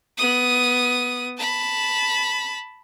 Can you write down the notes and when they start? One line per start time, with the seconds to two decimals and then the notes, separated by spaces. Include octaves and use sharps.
0.18 B3 D#6
1.38 A5 B5